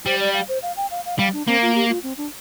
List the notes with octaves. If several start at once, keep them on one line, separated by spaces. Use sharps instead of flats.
G3 C5
D5
F5
C5
F5
G5
F5
F5
G3 F5
D4
A#3 C4
F4
G4
F4
C4
D4